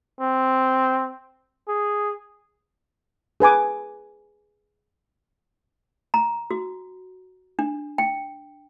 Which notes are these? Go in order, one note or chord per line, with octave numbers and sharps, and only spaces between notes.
C4
G#4
G#4 B4 G#5 D6
A#5
F#4
D4
G5